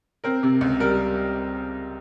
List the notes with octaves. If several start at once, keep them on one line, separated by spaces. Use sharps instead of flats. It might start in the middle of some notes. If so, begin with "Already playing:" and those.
C4 A#4
C3
C#2
G3 A#4